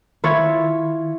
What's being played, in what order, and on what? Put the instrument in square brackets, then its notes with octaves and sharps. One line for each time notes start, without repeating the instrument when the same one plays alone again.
[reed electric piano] D#3 [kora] E4 F4 C#5